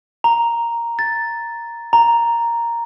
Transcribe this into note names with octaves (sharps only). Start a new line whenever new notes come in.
A#5
A6
A#5